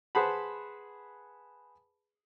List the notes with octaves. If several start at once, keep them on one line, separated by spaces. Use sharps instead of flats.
G#4 B4 C5 F#5 A5 B5